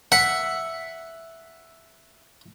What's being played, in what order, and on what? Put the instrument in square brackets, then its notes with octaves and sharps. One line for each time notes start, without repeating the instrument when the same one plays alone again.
[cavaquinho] E5 [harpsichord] F#5